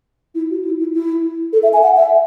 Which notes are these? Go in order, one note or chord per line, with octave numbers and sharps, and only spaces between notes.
E4
F#4
E4
E4
E4
A4
E5
G#5
F#5
E5